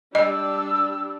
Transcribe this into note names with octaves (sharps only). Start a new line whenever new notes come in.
G3 D4 D#5 E6